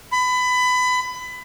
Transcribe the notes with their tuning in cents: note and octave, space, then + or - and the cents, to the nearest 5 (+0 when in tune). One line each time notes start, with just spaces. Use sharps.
B5 +25